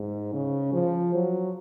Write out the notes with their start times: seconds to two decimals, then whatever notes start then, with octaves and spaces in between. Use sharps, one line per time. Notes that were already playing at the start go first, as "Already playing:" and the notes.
Already playing: G#2
0.34 C#3
0.73 F3
1.14 F#3